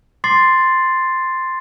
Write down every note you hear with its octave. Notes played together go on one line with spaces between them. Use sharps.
C6 D6 A6 C7